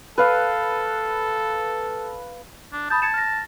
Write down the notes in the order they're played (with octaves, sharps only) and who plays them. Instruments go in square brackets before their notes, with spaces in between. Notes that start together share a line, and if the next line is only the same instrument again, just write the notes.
[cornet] A4 [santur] B4 F5
[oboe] D4
[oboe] A5 [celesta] B5 D#6 G6
[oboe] A5 [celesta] G#6 C#7 E7
[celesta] F6 A#6